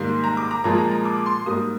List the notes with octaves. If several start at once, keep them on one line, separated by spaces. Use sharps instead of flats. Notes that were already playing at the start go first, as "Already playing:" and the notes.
Already playing: G#2 D#3 G3 A#3 C6
A#5
D6
A#5
A#2 F3 G#3 A#5
A#5
A#5
D6
C6
G#2 G3 A#3 D#6